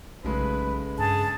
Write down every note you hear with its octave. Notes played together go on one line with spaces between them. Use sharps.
B1 C#3 G#3 A3 B4
G2 G#4 A5